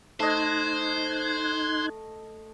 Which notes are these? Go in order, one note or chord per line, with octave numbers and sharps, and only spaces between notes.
A3 D#4 C5 D#5 F#6 G#6